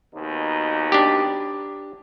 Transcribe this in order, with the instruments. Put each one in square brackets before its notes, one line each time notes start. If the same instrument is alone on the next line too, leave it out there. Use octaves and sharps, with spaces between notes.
[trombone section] D#2 B2 D#4
[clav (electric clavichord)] D4 G4